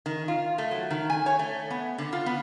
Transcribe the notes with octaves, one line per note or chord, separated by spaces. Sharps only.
D#3
F4
A3
F#3
D#3
G#5
C#5
A3
B3
D3
F4
B3